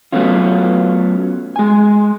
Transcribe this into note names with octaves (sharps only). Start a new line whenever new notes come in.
F#3 A3 B3 C#4 F4
G#3 G#5